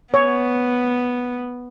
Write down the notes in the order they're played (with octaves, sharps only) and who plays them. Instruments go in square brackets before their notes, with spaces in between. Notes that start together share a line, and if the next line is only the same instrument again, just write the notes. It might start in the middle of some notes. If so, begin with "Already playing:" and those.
[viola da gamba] B3 [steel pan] C#5